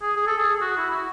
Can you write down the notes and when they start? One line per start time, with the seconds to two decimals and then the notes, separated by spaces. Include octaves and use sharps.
0.02 G#4
0.16 G#4
0.27 A4
0.38 G#4
0.56 G#4
0.61 F#4
0.77 E4
0.91 F#4